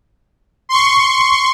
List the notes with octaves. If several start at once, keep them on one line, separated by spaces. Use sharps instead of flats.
C6 C#6